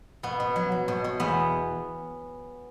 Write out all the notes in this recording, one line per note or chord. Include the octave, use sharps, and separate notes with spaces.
B2 B3
B2
F#3
F#3
B2
B2
E2 B3